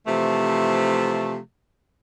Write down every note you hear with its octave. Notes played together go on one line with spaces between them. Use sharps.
C3 E3 F3 A3